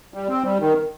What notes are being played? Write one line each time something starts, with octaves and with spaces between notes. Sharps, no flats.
G3
C4
G3
D#3